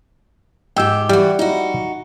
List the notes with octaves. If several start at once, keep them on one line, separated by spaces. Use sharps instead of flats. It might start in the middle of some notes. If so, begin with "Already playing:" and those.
G#2 G4 G5 E6
E3 G3 F#4 G4
D#4 E4 F#4